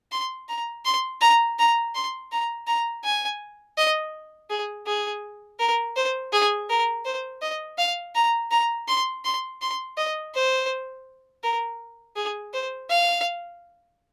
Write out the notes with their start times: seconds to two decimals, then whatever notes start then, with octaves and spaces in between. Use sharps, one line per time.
0.12 C6
0.49 A#5
0.85 C6
1.21 A#5
1.59 A#5
1.95 C6
2.32 A#5
2.67 A#5
3.04 G#5
3.77 D#5
4.50 G#4
4.87 G#4
5.59 A#4
5.96 C5
6.33 G#4
6.69 A#4
7.05 C5
7.42 D#5
7.78 F5
8.15 A#5
8.51 A#5
8.88 C6
9.25 C6
9.62 C6
9.97 D#5
10.35 C5
11.43 A#4
12.16 G#4
12.53 C5
12.90 F5